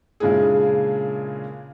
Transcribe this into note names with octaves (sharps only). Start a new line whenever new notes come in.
A#2 C#3 G#3 D4 E4 G#4